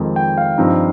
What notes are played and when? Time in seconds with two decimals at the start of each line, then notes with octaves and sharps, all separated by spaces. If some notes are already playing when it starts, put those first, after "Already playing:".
Already playing: F2 D#3 G#3 D#4
0.16 G5
0.38 F5
0.58 G2 F3 C4 D#4